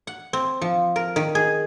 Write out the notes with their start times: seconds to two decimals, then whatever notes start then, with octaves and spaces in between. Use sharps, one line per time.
0.07 F#5
0.33 C4
0.62 F3
0.96 A#4
1.16 D#3
1.35 G#4